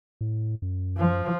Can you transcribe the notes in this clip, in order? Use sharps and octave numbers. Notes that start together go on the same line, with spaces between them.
A2
F#2
F3